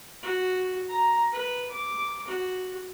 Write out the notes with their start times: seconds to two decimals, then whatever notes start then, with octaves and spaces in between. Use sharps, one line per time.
0.23 F#4
0.89 A#5
1.32 B4
1.71 D6
2.28 F#4